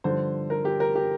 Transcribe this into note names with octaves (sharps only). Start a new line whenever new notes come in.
G2 D3 F3 C5
A#4
G4
A#4
G4